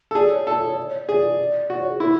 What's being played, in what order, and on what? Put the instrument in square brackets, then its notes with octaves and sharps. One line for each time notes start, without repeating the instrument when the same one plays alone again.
[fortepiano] A4
[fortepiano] G#4 [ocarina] D5
[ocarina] C#5
[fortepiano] A4 [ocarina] D5
[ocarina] D5
C#5
D5
C#5
D5
[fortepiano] G#4
[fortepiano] F#4 [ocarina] D5
[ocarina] C#5
G#4
[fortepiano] E4 [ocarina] A4